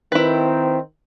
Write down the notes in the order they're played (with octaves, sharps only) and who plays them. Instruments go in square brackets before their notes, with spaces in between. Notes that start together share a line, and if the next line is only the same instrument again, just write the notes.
[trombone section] D#3 C4 [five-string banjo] E4 B4